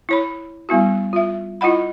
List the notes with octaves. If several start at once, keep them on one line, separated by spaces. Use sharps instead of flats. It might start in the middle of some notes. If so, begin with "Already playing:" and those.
E4 C#5 B5
G3 B3 E4 F#4
F4 E5
E4 F4 D#5 F#5 B5